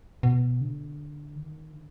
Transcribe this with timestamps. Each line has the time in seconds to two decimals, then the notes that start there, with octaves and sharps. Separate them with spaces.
0.23 B2
0.61 D3
1.35 D#3
1.73 D3